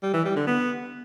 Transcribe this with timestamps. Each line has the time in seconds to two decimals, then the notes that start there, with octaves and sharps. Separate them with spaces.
0.03 G3
0.14 E3
0.25 G3
0.36 D3
0.47 B3